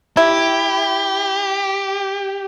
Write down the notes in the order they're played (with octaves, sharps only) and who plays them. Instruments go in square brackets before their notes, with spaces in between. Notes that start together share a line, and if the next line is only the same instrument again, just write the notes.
[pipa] E4 [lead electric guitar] G4